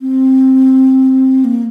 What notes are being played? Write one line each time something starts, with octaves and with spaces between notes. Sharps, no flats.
C4
A#3